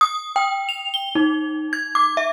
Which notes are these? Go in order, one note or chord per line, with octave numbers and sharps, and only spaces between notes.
D#6
G5
F7
G7
D#4
G#6
D6
E5